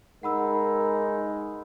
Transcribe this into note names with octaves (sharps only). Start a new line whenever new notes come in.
G#3 D#4 A#4 F#5 B5 E6